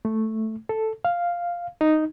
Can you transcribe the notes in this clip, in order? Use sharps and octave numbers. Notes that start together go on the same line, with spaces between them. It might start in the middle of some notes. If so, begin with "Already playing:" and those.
A3
A4
F5
D#4